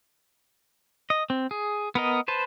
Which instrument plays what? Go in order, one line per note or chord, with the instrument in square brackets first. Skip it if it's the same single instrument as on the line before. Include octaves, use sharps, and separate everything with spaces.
[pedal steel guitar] D#5
C4
G#4
B3 A#4 D#5
B4 C5 A5